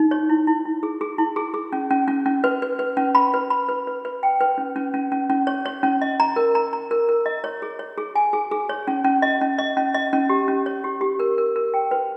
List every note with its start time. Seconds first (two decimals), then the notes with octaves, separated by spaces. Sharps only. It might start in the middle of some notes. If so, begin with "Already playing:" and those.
Already playing: D#4
0.11 C#5
0.29 E4
0.47 E4
0.65 E4
0.83 G#4
1.01 G#4
1.18 E4
1.36 G#4
1.54 G#4
1.73 C#4
1.90 C#4
2.08 C#4
2.26 C#4
2.44 B4
2.62 B4
2.79 B4
2.97 C#4
3.15 B5
3.34 B4
3.50 B5
3.69 B4
3.87 B4
4.05 B4
4.23 G5
4.41 B4
4.58 C#4
4.76 C#4
4.94 C#4
5.12 C#4
5.30 C#4
5.47 C#5
5.66 C#5
5.83 C#4
6.02 D#5
6.20 A#5
6.36 A#4
6.55 A#5
6.73 A#5
6.91 A#4
7.09 A#4
7.26 D#5
7.44 C#5
7.62 G#4
7.79 C#5
7.98 G#4
8.15 G#5
8.33 G#4
8.51 G#4
8.69 C#5
8.87 C#4
9.04 C#4
9.22 D#5
9.41 C#4
9.59 D#5
9.77 C#4
9.94 D#5
10.13 C#4
10.29 G4
10.48 C#4
10.66 C#5
10.84 G4
11.01 G4
11.19 A#4
11.38 A#4
11.56 A#4
11.74 G5
11.91 B4